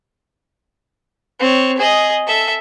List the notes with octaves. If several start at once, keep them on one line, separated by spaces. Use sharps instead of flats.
C4 C#5
G#4 D#5
A4 E5